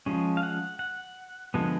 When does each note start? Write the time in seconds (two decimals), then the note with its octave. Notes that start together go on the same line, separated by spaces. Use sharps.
0.06 F3 G#3 C#4
0.37 F5
0.43 F#5
0.79 F#5
1.54 D3 F3 G#3 B3